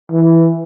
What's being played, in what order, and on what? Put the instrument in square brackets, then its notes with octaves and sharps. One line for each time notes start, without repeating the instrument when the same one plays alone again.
[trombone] E3